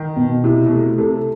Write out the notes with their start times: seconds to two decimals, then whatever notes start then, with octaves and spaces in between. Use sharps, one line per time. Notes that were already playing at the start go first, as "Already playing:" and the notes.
Already playing: D#3
0.16 B2
0.44 C3 E4
0.66 B2
0.71 C3 A3
0.98 C3 A4